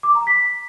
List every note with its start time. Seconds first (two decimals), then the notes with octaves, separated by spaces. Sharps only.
0.03 D6
0.15 A#5
0.27 B6